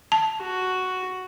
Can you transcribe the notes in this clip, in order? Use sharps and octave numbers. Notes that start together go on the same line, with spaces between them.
A5
F#4